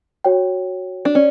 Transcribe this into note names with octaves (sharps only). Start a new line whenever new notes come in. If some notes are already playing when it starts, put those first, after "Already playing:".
F#4 C#5 G5
D4
C#4 D5